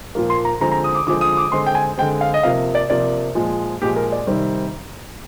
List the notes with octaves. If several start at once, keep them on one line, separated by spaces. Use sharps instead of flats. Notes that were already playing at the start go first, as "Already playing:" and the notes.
A#2 F3 A#3
C6
A#5
D3 F3 G#3 C4 A#5
A#5
D#6
D6
D3 F3 G#3 C4 D6
D#6
D6
D3 G#3 C4 C6
G5
G#5
D3 G#3 C4 G5
F5
D#5
C3 F3 A#3 F5
D5
C3 F3 A#3 D5
A#2 F3 G#3
A#2 F3 G#3 G4
A#4
D5
C3 D#3 G3 C4